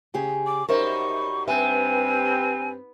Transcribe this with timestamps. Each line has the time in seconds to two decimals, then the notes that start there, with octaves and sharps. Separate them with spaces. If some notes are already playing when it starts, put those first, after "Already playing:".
0.14 C#3 G4 G#4
0.47 D6
0.69 F#2 G3 D#4 A#4 C5 E5 C#6
1.48 G2 B3 C4 E5 G#5